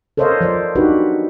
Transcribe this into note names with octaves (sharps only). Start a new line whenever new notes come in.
A4 A#4 C5 C#5 D#5 F5
F3 C5 D5
D4 D#4 F#4 G4 B4